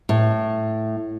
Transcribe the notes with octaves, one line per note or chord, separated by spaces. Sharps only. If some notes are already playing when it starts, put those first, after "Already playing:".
A2